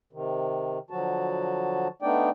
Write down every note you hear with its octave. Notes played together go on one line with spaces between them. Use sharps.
C3 D#3
D3 F3 F#3 F#4 A5
A3 B3 D4 D#4 D5 G5